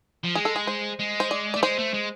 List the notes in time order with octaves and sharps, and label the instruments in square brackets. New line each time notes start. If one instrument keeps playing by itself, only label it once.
[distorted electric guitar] F3
[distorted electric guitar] G#3 [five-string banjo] G#4
[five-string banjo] A4
G#4
C5
[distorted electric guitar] G#3
[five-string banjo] C5
D5
[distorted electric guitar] A3 [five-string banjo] D5
[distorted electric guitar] G#3 [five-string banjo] C5
[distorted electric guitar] A3
G#3